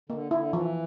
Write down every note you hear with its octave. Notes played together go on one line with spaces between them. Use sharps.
D3 A#3
D3 E4
E3 F3